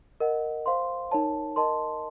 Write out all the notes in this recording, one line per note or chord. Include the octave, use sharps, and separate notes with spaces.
A#4 D#5 F#5
C5 F5 C6
D#4 A#4 C#5 A5
A#4 D#5 A5 C6